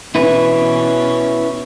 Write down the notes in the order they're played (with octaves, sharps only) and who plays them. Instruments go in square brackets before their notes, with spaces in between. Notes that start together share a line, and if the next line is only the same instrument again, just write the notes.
[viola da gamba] B2 C#4 [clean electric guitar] E4 B4